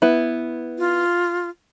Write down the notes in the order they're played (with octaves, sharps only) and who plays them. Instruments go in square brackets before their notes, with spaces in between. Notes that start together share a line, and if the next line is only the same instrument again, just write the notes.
[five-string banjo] B3 E4
[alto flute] F4